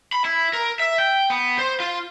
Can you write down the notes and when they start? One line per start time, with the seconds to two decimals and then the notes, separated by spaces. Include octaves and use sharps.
0.12 B5
0.25 E4
0.53 A#4
0.79 E5
0.98 G5
1.30 B3
1.59 C5
1.80 F4